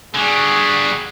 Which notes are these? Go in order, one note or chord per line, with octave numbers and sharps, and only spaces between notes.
D3 G3 F#4 G#4